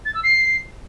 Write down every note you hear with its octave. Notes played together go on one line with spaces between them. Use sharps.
A6
E6
C7